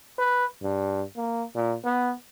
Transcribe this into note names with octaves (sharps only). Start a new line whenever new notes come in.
B4
G2
A#3
A#2
B3